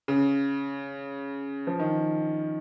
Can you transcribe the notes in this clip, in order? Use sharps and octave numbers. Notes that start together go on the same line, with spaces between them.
C#3
F3
D#3